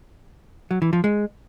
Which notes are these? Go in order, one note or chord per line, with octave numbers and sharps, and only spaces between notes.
F#3
E3
F3
G#3